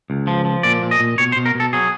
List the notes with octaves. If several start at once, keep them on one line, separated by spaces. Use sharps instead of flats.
C#2
F3
F3
A#2 D5
A#2
D#5
A#2
B2 C#5
C5
B2
A#4
B2
A4
F#3 G#4